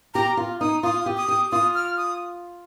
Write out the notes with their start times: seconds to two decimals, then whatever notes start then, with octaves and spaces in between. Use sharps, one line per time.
0.14 G4 A#5
0.37 F4
0.61 D#4 D#6
0.83 F4 D#6
1.06 G4
1.17 D#6
1.28 G4
1.52 F4 D#6
1.75 F6
1.97 D#6